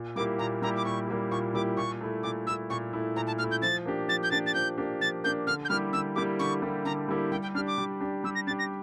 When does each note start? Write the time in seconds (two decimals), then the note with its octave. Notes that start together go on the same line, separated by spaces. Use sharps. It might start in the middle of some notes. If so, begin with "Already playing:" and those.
Already playing: A#2
0.16 G3 A#3 E4 G4 D6
0.38 A#2 A#5
0.62 G3 A#3 E4 G4 A#5
0.77 D6
0.85 A#2 C#6
1.08 G3 A#3 E4 G4
1.31 A#2 C#6
1.54 G3 A#3 E4 G4 D6
1.77 A#2 C#6
2.01 A3 E4
2.23 A#2 D6
2.46 A3 E4 E6
2.70 A#2 C#6
2.93 A3 E4
3.16 A#2 A#5
3.27 A5
3.39 A3 E4 F6
3.51 G6
3.62 F3 A6
3.86 A#3 D4 G4
4.08 F3 A6
4.23 G6
4.31 A#3 D4 G4 A6
4.46 A6
4.54 F3 G6
4.78 A#3 D4 G4
5.00 F3 A6
5.24 A#3 D4 G4 G6
5.47 D3 F6
5.65 G6
5.70 G3 A#3 E4 G4 F6
5.93 D3 E6
6.16 G3 A#3 E4 G4 D6
6.39 D3 C#6
6.62 G3 A#3 E4 G4
6.85 D3 A#5
7.09 G3 A#3 E4 G4
7.32 G3 G5
7.43 G5
7.55 D4 F6
7.58 G4
7.67 D6
7.78 G3
8.01 D4 G4
8.24 G3 E6
8.35 A#6
8.47 D4 A6
8.50 G4
8.59 A#6